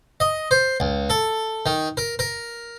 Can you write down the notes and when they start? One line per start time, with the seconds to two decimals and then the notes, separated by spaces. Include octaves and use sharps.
0.20 D#5
0.51 C5
0.80 C#2
1.10 A4
1.66 D#3
1.97 A#4
2.19 A#4